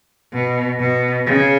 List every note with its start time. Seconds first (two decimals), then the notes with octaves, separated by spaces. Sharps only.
0.33 B2
0.79 B2
1.26 C#3